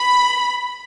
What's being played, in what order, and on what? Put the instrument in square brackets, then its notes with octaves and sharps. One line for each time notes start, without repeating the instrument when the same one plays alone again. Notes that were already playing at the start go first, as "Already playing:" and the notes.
Already playing: [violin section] B5